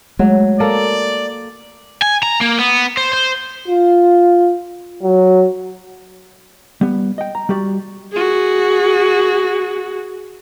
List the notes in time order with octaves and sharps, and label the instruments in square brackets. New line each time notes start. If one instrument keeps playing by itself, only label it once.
[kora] F#3 [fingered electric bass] G#3 A3
[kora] A#3 A4 [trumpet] D5
[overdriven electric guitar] G#5
A#5
A#3
B3
C5
C5
[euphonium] F4
F#3
[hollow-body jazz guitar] G3 B3
D#5 G5
A#5
G3 F#4 G4 D5
[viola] F#4 G#4